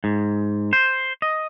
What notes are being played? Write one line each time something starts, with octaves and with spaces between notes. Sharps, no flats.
G#2
C5
D#5